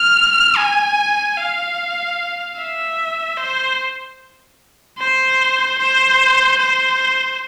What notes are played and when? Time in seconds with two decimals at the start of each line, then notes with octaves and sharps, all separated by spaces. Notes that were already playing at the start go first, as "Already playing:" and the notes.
Already playing: F6
0.57 G#5
1.37 F5
2.57 E5
3.37 C5
4.99 C5
5.79 C5
6.58 C5